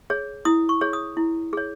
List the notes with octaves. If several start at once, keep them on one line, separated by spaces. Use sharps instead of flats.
G#4 C#5
E4 D#6
C#6
G#4 C#5
D#6
E4
G#4 C#5